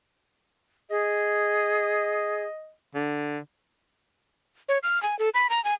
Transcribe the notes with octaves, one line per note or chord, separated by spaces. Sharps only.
G#4 D#5
D3
C#5
F6
G#5
A4
B5
A#5
G#5